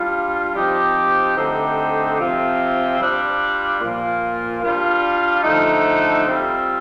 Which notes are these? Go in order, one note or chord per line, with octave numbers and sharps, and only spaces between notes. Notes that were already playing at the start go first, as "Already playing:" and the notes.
Already playing: G3 D4 F4
F3 C4 D#4 G4
D3 A3 C4 D#4 G4
C3 F3 C4 F4
G3 D4 F4
A#2 F3 A#3 F4
G3 D4 F4
D3 F3 A3 D#4
G3 C4 F4